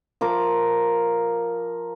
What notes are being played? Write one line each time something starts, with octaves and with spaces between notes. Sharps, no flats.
F3 A#4 D6